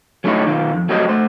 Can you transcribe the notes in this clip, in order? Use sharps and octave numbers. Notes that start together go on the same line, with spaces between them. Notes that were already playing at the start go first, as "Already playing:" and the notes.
F#3 A3 C#4 D#4 E4 C#5
B1 D#3 F4
F2
F#3 G3 A3 C4 C#5 D#5
A3 C5